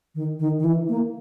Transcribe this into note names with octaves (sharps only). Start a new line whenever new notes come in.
D#3
D#3
D#3
E3
A#3